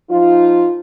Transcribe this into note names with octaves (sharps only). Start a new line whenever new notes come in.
F3 D#4 F4